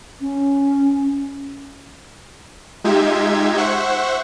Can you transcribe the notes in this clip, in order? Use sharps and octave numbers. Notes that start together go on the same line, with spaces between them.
C#4
G#3 D#4 F4 G4 E5 G#6
C5 E5 F#5 C#6